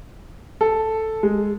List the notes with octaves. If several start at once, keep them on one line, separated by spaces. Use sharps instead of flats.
A4
G#3